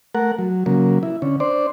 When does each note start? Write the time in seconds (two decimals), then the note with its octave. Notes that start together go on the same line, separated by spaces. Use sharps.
0.15 A3 A#4 F#5
0.39 F#3
0.66 C#3 F#3 A#3
1.03 E4
1.22 D3 C#4
1.40 D4 C5 D5